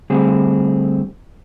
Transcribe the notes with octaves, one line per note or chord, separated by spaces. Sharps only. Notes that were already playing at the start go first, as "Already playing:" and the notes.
D3 G3 A3 C4 G#4